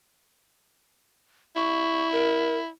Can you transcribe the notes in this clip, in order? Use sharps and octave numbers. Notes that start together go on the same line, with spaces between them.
E4 C#6
A#4